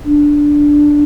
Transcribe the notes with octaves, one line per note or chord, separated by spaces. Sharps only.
D4